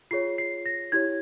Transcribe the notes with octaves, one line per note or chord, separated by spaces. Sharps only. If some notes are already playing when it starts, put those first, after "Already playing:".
F4 G#4 C#5 C7
C7
A#6
E4 G4 C#5 G#6